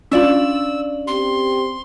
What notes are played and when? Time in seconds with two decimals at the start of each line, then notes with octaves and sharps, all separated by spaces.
0.12 C#4 D4 F4 D5 E6 F#7
1.07 C4 G4 C6